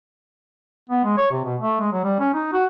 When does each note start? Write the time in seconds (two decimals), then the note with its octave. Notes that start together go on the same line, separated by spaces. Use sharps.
0.90 B3
1.04 G#3
1.17 C#5
1.31 C3
1.45 B2
1.61 A3
1.80 G#3
1.92 F#3
2.04 G3
2.20 C#4
2.34 D#4
2.53 F#4